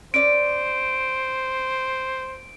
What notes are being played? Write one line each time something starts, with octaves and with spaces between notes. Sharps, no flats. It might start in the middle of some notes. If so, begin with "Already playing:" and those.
C#4 C5 D5 D7